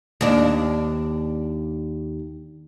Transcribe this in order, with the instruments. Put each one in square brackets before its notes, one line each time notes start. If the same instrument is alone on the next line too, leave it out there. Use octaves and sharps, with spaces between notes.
[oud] D#2 D4